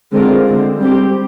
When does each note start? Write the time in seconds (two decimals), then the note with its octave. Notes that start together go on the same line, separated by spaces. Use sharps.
0.11 D3 G#3 C4 F4 A#4
0.46 D3 G#3 C4
0.80 G3 C4 G4